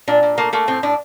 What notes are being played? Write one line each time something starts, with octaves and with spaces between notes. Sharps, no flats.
A#2 D4
A#2
A3 A#3
A3 A#3
A2 C4
A2 D4